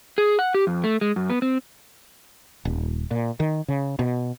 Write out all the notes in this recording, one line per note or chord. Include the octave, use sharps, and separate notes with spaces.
G#4
F#5
G4
F2
A3
G#3
F#2
B3
C4
D#1
A#2
D#3
C#3
B2